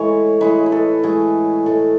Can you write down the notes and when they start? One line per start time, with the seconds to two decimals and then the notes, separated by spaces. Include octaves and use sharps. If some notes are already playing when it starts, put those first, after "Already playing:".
Already playing: A2 E3 G#3 C#5
0.41 A2 E3 G#3 B4
0.66 B4
0.72 A4
1.03 A2 E3 G#3 G#4
1.66 A2 E3 G#3 A4